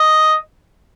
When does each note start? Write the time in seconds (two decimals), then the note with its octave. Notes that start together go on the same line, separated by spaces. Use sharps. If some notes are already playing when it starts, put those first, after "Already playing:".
Already playing: D#5